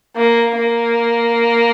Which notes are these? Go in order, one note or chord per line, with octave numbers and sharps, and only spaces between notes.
A#3
A#3